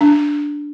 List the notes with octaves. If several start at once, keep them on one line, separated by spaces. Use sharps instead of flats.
D4